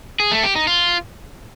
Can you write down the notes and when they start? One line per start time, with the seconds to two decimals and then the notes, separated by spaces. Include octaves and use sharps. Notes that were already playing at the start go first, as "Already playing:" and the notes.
0.20 G#4
0.32 A3
0.43 G4
0.55 D#4
0.67 F4